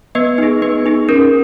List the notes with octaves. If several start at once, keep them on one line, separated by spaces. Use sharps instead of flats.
B3 B4 D#5
D#4 G#4
B3 B4
D#4 G#4
C#4 A#4